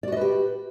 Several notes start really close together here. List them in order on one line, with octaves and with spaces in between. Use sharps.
D5 F#4 D#5 B4 G4